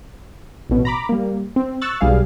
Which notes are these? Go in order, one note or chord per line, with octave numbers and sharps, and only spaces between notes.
A1 B2
A#5 B5 D6
G3 A#3
C4
C#6 E6 F#6 A6
B1 G3 G#4 F5